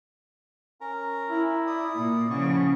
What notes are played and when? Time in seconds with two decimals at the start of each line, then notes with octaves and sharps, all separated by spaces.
0.81 C#4 A#4 A#5
1.31 E4
1.67 D5 D#6
1.96 A#2
2.30 C#3 F3 B3 G#4 C#6